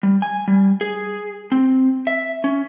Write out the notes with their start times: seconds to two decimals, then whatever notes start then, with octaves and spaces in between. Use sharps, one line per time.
0.03 G3
0.22 G#5
0.48 G3
0.81 G#4
1.52 C4
2.07 E5
2.44 C#4